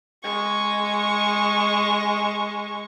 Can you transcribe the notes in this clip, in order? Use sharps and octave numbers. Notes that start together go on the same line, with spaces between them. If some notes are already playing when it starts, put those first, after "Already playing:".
G#3 C#6